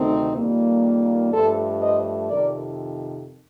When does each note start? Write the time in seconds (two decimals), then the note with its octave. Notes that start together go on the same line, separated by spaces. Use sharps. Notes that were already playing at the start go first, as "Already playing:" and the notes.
Already playing: D2 C3 D#3 A3 C4 D#4
0.37 F2 D#3 G3 A#3
1.33 G2 F3 A3 A4 C5
1.82 C5 D#5
2.30 F2 C3 D#3 A#4 D5